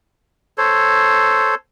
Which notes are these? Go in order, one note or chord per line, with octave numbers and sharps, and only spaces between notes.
A4 C5 C#5